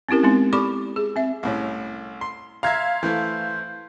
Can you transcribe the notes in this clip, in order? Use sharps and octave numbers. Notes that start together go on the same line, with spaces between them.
C4 C#4 E4 G4 A#4
G#3 B3 C4 D#4
G4 A4 D5 B5 C#6 D6
G#4
C4 E5
C2 A2 C#4
C6
E5 F5 A#5 C6 G#6
E3 A3 C5